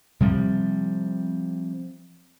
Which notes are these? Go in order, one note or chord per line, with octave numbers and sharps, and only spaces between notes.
C3 F3 G3